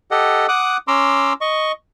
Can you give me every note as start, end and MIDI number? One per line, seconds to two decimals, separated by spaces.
0.11 0.47 67
0.11 0.47 69
0.11 0.47 75
0.11 0.47 78
0.48 0.77 78
0.48 0.77 86
0.48 0.77 87
0.48 0.77 90
0.88 1.33 61
0.88 1.33 82
0.88 1.33 84
0.88 1.33 86
0.88 1.33 88
1.41 1.72 75
1.41 1.72 85